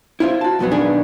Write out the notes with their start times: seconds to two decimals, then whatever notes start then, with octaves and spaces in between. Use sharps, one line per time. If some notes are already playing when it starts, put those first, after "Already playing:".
0.20 E4 F4 C5
0.41 F#4 A5
0.59 B1 F2 B2 F#3 B3
0.71 B1 D#3 B3 D4 G#4